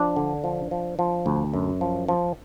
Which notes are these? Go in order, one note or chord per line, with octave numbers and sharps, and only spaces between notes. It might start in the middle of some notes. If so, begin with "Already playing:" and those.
Already playing: F3 D4
D3
F3
F3
F3
D2
F#2
F3
F3